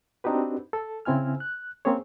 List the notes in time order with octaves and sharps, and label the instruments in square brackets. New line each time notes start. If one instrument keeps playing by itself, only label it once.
[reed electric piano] C4 D4 D#4 F#4 G4 B4
A4
C#3 C4 E4 G#5 F6
F#6
A#3 C4 C#4 G#4 C#5